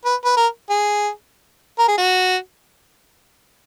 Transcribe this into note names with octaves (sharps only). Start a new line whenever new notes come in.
B4
B4
A#4
G#4
A#4
G#4
F#4